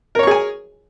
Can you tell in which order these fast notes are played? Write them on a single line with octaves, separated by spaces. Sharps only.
A#4 C#5 C#6 G#4 G#5